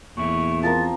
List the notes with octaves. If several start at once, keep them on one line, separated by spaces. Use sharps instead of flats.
E2 A#2 E4 C#6
F3 C4 A#4 A6